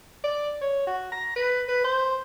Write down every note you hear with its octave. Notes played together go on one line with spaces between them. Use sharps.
D5
C#5
F#4
A#5
B4
B4
C5